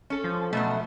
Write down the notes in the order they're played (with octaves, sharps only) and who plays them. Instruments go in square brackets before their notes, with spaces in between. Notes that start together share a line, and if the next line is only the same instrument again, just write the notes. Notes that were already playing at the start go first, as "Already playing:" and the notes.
[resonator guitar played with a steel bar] C#4 A4
[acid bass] F3
[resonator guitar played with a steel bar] B2 F#3 B3 [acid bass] A3